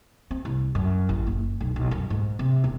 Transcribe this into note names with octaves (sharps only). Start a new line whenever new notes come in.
C4
C2
F#2
A1
F#1
B1
B1
F#2
G#2
C3
E1